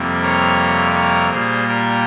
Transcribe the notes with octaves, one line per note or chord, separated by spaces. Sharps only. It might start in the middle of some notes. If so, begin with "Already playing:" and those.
Already playing: F2 C3 G3 A#3
A#4 C#5
A#4 C#5
A#2 G3 A#3 G#4 C5
G4 A#4